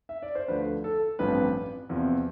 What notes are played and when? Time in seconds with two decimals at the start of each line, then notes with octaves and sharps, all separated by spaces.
0.09 E5
0.22 D5
0.35 C5
0.48 D2 D3 F3 B4
0.84 A4
1.19 A1 G2 F3 C4 B4
1.89 E2 C3 F3 C4